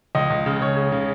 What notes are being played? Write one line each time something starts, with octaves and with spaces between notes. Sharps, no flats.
C#2 D#5
C#2
C#3
C#3 C#5
C#3
C#3